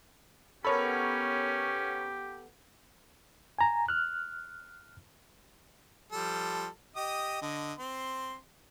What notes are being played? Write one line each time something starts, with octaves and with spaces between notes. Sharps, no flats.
B3 C#4 G4 A4 A#4 C#5 B5
G#5 A#5
F6 F#6
F3 G3 A4
G4 D#5 D#6
D3 D#5
C4 C6